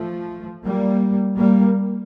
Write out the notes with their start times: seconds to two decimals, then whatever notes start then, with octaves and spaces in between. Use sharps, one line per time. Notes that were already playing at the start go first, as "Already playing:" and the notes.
Already playing: F3 A3
0.65 G3 A#3
1.38 G3 A#3